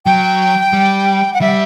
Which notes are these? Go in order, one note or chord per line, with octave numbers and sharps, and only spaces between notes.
F#3 G5
G3
F#5
G3 E5